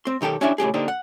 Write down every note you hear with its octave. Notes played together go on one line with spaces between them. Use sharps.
C4 C6
B1 D#3 G4 A4 G5
C#4 D4 E4 G4 E5 G#5
C#2 A2 G4 G#4
D3 A#3 D4 D#4 G4 C5
F#5